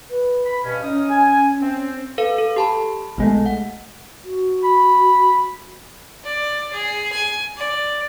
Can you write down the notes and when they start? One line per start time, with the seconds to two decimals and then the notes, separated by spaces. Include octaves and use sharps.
0.10 B4
0.46 B5
0.64 G2 B2 C#4
0.82 C#4 D#4 D#6 F6
1.10 G#5
1.62 C4
2.18 A4 B4 F5
2.38 A4
2.56 G4 A5 B5
3.18 B1 G#3 A3
3.46 F#5
4.25 F#4
4.64 B5
6.24 D5
6.73 G#4
7.12 G#5
7.57 D5